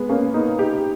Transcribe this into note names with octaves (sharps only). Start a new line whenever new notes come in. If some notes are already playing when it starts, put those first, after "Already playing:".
Already playing: G#3 B3
A#3 C#4
B3 D#4
D#4 G4